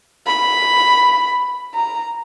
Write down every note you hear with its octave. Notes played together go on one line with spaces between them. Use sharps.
B5
A#5